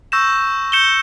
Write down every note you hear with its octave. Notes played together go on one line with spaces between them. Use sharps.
C#6 E6 G6 A#6 E7
G6 C#7 E7 G7